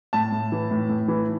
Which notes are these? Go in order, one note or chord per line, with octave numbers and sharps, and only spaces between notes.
A2 A5
A2
E3
A2
A2
E3